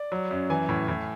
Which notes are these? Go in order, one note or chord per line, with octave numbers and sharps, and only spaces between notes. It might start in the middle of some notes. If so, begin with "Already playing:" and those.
Already playing: D5
F#3
F#2
E3 G#5
A2
A2